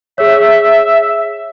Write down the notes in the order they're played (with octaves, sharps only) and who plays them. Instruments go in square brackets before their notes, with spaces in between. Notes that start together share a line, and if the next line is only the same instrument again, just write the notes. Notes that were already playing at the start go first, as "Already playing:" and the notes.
[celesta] G#4 C#5 [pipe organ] E5